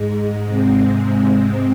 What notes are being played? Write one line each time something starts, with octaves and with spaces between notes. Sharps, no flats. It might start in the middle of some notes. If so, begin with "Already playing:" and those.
Already playing: G#2 G#3
C3 C4